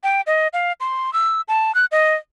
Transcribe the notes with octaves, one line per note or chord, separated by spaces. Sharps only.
G5
D#5
F5
C6
E6
A5
F#6
D#5